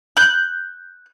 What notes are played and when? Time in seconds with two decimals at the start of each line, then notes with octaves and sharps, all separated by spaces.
0.17 F#6 G6